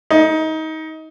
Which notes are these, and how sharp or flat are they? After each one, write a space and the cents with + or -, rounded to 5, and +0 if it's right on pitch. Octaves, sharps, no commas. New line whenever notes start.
D#4 +25